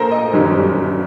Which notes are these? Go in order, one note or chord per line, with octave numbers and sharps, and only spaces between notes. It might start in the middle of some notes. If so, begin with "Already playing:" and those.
Already playing: A#1 A#2 A3 A4 A#4 C5
D#5
G1 F#2 D#3 G3